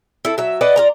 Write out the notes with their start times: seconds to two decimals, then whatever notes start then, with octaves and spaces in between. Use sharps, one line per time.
0.25 E4 A4
0.38 F#3 E5
0.61 B4 D5 D#5 F#5
0.76 F4 D5 A#5